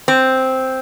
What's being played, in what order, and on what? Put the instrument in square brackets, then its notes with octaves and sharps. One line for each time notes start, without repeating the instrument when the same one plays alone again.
[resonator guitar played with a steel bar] C4